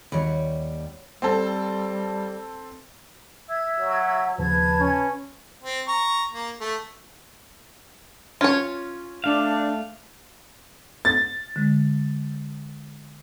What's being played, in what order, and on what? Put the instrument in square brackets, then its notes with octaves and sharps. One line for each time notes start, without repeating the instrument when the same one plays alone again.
[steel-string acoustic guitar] D#2 G3 [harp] C#5 F#5 B5
[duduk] G3 [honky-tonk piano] C4 A4
[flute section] E5 E6 G#6
[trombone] F#3
[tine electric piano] D#2 C#3 F3 [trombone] B4 [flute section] A5 G#6
[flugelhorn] C#4
[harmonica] C4
A#5 C#6
A#3
A3
[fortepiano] C#4 [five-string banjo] F4 C#5
[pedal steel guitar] A3 F5 [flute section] D4
[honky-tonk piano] A6
[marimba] D3 G#3